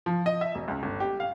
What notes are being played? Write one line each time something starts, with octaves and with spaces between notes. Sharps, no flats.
F3
D#5
E5
E1
C#2
G1
G4
F5